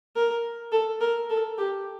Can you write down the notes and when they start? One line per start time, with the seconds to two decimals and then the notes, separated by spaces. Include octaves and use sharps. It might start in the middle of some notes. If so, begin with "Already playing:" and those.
0.16 A#4
0.72 A4
1.01 A#4
1.30 A4
1.58 G4